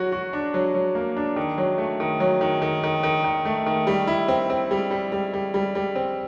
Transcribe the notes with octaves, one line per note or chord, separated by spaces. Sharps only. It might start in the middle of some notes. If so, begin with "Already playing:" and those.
Already playing: F#3 F#4
F#4
D4
F#3
F#3
A#3
D4
D#3
F#3
A3
D#3
F#3
D#3
D#3
D#3
D#3
D#3
A3
D#3
G3
E4
C4
C4
G3
G3
G3
G3
G3
G3
C4